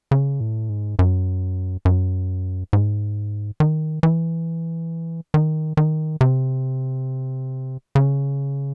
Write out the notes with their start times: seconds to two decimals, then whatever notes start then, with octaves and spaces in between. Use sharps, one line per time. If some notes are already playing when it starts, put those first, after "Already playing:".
0.11 C#3
0.40 A2
0.69 G#2
0.99 F#2
1.85 F#2
2.73 G#2
3.60 D#3
4.03 E3
5.34 D#3
5.77 D#3
6.21 C3
7.95 C#3